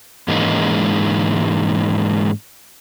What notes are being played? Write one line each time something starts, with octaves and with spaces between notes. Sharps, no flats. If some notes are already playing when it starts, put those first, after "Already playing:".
G#2 E3 G#3 A#3 C#4 D#4